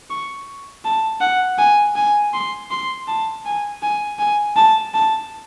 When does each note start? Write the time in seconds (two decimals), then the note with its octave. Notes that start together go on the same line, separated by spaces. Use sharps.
0.10 C#6
0.85 A5
1.21 F#5
1.58 G#5
1.96 G#5
2.33 C6
2.71 C6
3.08 A5
3.45 G#5
3.82 G#5
4.19 G#5
4.57 A5
4.94 A5